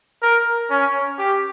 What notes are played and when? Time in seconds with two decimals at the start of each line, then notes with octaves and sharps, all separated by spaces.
0.23 A#4
0.70 C#4
1.18 G4